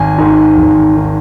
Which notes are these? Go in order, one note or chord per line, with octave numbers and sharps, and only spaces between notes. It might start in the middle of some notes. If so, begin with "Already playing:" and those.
Already playing: G#1 G#5
G#2 D#3
G#1
D#3